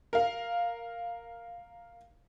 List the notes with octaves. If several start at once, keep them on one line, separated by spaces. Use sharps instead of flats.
A#4 F5